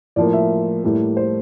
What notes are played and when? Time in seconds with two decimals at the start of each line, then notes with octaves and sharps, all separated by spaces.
0.16 A2 F3 A#3 D5
0.33 E5
0.84 A2 G3 A#3
1.17 C5